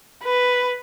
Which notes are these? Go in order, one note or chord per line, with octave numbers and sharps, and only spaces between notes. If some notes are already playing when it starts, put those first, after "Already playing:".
B4